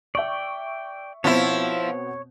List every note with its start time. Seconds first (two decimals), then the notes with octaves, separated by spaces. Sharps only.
0.15 D5 E5 G5 C#6
1.24 B2 F3 B3 C4 E4 C#5